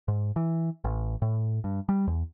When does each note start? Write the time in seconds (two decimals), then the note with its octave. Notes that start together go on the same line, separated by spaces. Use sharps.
0.08 G#2
0.36 E3
0.84 A1
1.22 A2
1.64 G2
1.89 G3
2.07 E2